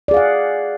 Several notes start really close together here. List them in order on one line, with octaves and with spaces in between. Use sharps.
D5 G#4 F5 F#5